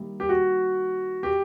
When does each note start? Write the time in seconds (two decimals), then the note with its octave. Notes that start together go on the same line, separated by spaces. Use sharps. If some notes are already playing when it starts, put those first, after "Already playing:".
Already playing: D#3 G3 A#3 E4
0.20 G4
0.29 F#4
1.23 G4